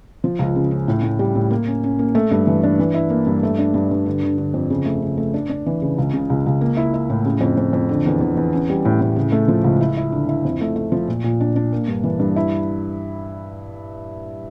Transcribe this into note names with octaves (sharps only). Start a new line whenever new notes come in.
F3
C#2
C#3
C#4
A2
A2
G3
A2
A#3
C#4
C#4
A#3
A3
G2
E3
D4
E3
E4
A#3
G2
A3
D4
G2
G2
D3
D3
D3
F2
C#3
A3
C#3
A3
D4
D4
E3
C#3
C#2
C#3
C#2
C#2
A#3
E4
E4
A2
C#3
F2
F2
F2
D3
E2
E2
E2
C#4
G3
A2
A2
C#3
A3
F3
C#2
E4
E4
D3
E4
F2
A3
A3
F3
A#2
A#2
D4
D4
A#3
G2
E3
G2
E4